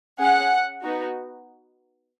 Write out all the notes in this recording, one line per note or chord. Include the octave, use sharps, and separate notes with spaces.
C#4 G#4 F#5
B3 D#4 F#4